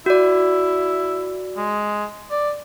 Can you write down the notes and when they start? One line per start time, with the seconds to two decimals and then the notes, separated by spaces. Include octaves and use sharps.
0.06 E4 F#4 D5
1.57 G#3
2.31 D5